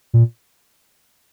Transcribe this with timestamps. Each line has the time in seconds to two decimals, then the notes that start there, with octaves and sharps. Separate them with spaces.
0.14 A#2